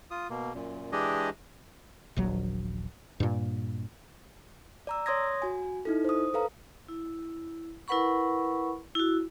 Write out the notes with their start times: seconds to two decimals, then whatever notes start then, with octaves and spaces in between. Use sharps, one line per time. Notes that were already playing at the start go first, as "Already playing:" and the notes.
0.11 F4 D#6
0.30 B2 A#3
0.54 F#2 A#2
0.92 E3 G#3 D4 G4 G#4 D#5
2.16 D#1 A#1 F#3
3.20 G2 A#2
4.87 D5 A#5 E6
5.06 C#5 C6 D#6 G#6 A#6
5.42 F#4 G#5
5.85 D#4 E4 A4
6.05 C5 D#6
6.34 A4 B4 F5 A#5
6.88 E4
7.88 E4 A#4 B4 F#5 B5 C#6
8.95 E4 F#4